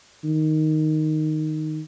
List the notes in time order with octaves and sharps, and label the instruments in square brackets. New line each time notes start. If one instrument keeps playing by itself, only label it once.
[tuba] D#3